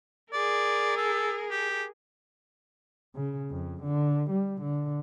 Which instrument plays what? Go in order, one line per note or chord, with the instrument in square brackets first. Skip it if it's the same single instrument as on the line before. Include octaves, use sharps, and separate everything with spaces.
[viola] G#4 A#4 [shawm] D5
[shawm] A4
G4
[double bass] C#3
F2
D3
G3
D3